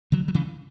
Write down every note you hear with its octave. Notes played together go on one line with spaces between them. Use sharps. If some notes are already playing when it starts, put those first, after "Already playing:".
D3 F#3
F#3
C#3 E3